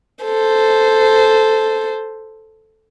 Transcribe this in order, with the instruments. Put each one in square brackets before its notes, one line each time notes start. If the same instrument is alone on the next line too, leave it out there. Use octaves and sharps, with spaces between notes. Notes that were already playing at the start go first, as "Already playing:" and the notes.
[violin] A4 C5